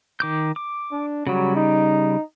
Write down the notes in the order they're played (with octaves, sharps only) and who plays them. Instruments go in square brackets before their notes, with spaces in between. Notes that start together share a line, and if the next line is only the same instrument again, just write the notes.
[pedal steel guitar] D#3 D6 G6
D6
[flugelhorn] D4
[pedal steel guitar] C#3 G3 [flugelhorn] F#3
[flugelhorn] D#4